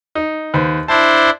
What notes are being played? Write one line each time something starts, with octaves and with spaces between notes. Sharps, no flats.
D#4
D#2 B4 C5
D4 E4 C5 A5